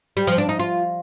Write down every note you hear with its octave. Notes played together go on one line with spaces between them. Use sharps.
G3
F3
D4
D#4
F4